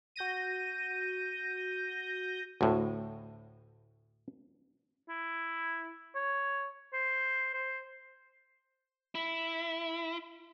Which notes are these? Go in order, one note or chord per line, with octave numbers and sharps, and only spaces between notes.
F#4 G6 A#6 D#7
D2 A2
E4
C#5
C5
C5
E4